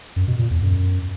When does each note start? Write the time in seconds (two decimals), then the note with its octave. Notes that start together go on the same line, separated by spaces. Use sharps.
0.16 F#2
0.28 B2
0.39 A#2
0.51 E2
0.62 F#2